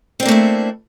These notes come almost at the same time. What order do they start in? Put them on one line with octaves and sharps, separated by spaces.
C4 D4 A#3 A3 E4